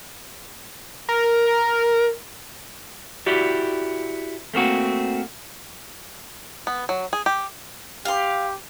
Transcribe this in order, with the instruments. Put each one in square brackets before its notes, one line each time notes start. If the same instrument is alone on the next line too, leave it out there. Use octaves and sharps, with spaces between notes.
[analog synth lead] A#4
[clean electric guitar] E4 F#4 G4 D5
A3 A#3 C4 F#4
[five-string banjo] B3
F#3
G#4
G4
[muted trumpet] G4 [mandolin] F5 C6